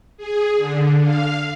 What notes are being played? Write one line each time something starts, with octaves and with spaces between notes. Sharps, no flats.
G#4
D3
F5